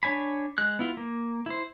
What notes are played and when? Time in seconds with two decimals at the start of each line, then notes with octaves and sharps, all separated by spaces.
0.03 D4 C#5 G#5 B5
0.58 G#3 F#6
0.79 B3 E4 F4
0.97 A#3
1.46 E4 C5